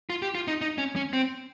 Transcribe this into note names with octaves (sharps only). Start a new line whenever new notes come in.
F4
G4
F4
D#4
D#4
C#4
C#4
C4